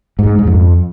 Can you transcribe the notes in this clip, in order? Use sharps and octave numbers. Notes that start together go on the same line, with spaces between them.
G#2
G#2
F2